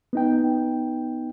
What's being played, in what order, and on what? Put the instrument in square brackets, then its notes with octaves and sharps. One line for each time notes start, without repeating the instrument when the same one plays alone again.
[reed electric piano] B3 D#4 G5